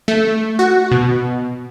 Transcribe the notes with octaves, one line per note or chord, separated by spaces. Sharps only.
A3
F#4
B2